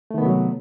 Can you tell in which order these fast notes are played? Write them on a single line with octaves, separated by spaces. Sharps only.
A3 D#3 B3 C3 F#3